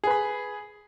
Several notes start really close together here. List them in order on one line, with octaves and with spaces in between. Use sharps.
G#4 B4 B5